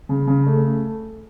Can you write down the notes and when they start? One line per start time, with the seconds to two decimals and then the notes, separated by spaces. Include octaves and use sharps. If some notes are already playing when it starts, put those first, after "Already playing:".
0.09 C#3
0.27 C#3
0.46 A3